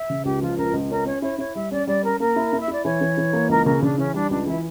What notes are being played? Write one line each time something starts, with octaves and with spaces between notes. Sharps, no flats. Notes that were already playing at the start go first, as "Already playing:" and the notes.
Already playing: E5
C#3
C#2 G4
F3 F4
C#2 A#4
C#2
C#4 A#4
C#4 C#5
E4 C#5
E4 C#5
G3 E5
C#4 D5
G3 D5
C#4 A#4
A#3 A#4
E4
E4
E5
E4 D5
E3 C#5
E3
E3
A#3
C#2 A#4
C#3 A#4
C#3 D4
E3 C#4
G3 D4
C#2 D4
E3 E4